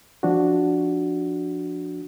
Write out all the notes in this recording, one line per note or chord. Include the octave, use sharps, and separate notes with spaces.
F3 D4 F#4